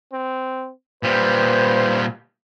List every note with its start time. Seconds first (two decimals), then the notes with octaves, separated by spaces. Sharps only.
0.12 C4
1.03 A#2 G3 B4 C5